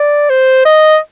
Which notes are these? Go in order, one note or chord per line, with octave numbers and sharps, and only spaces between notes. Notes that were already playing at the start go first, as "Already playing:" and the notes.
Already playing: D5
C5
D#5